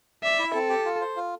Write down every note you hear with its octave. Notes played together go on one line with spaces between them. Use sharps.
D5 E5
E4
C4 A4
G4
F4
C5
F4